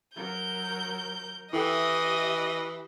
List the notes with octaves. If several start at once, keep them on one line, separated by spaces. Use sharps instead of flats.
F#3 A#4 G6
E3 E4 G4 A4 D#5 E5 G5